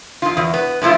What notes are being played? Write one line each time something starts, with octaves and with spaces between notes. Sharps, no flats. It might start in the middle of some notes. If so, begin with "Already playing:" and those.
F2 F4
E2
B3
A2 F3 G#3 E4 F4